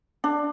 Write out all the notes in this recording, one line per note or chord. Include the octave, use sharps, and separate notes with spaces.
D4